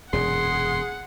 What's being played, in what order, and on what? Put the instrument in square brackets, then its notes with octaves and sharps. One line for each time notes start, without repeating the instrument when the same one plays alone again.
[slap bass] E1 F#2 A#2 [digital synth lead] G#4 [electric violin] F#5 [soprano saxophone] C6